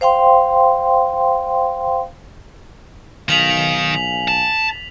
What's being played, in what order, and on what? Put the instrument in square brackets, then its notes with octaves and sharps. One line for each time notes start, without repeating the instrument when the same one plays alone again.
[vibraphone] C5 F5 G5 C6
[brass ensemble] B1 F5 G#5 [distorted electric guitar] D#3 [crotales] B6 F7 F#7
[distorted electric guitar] A5